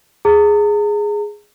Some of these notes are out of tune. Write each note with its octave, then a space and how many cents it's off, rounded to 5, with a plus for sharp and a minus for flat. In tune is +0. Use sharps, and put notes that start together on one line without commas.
G#4 +0 A#5 -40